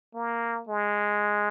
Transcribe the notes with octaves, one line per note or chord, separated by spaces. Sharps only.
A#3
G#3